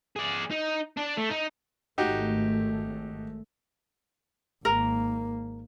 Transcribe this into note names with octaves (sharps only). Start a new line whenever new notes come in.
G#4 D5
D#4
D4 D5
A3
D#4
G#1 A3 D#4 F#4 G4
G#1 A#3 A#4